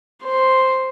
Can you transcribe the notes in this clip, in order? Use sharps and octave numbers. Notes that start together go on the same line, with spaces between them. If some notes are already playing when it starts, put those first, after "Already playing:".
C5